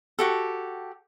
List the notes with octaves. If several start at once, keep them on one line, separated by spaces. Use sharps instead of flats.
F#4 G4 A4